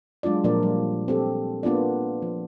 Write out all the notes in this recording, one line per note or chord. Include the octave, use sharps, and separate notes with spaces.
F#3 G#3 D4 F4 D5
A#2 F3 A#3 D4 A#4 D5
G3
C4 G4 A4
A#3 B3 D4 F4 D5
F3